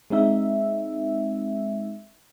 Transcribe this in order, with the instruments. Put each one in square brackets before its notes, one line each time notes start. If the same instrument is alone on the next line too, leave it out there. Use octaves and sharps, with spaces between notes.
[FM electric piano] G#3 C4 D#4 E5